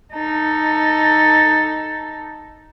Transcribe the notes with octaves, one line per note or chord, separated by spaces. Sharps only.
D#4 A4